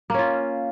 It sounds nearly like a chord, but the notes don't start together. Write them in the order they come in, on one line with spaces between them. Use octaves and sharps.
A#3 C#4 F4